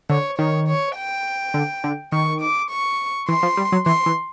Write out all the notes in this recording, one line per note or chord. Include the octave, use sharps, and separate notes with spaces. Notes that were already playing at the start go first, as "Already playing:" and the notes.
D3 C#5
D#3 C#5
C#5
G5
D3
D3
D#3 C#6
D6
C#6
E3 C6
F3
G3
F#3
E3 C6
E3